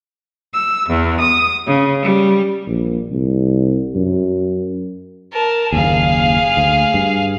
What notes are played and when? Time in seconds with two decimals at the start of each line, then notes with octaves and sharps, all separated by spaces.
0.53 E6
0.89 E2
1.20 D#6
1.66 C#3
2.02 G3
2.67 A#1
3.10 C2
3.95 F#2
5.33 A#4 A5
5.72 F#1 D#2 G#4 F5
6.57 D2
6.94 G2